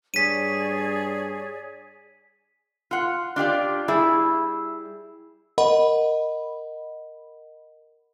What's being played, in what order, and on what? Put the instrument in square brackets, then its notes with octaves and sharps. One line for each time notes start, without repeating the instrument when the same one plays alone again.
[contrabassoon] G2 [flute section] G#4 C#5 D5 [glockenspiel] B6 D#7
[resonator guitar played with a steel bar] F4 F#5
D4 F4 G4 D5
G3 E4 G#4
[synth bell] A#4 D#5 F#5 B5